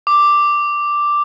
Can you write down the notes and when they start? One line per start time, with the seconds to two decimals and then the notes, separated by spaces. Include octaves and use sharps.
0.07 D6